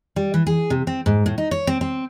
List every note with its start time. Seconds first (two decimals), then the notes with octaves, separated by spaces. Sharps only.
0.16 G3
0.34 E3
0.47 G#4
0.70 C3
0.87 C4
1.06 G#2
1.26 A2
1.38 D#4
1.51 C#5
1.67 C4
1.81 C4